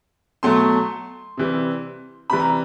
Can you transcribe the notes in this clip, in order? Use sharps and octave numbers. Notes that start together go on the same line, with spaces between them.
B2 F#3 A3 C6
C3 E3 G3
C3 E3 G3 B5
A#5